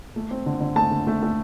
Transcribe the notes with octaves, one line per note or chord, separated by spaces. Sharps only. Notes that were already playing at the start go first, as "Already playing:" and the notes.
A3
C4
D3
D3
A3 A5
D3
A3
A3